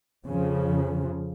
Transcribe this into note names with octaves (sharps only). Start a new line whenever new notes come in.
F2 C#3 F3